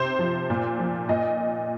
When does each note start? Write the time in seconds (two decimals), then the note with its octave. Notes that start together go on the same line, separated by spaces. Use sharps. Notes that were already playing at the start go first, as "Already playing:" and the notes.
Already playing: C3 C5
0.19 F3
0.50 A#2
0.79 F3
1.09 A#2 D#5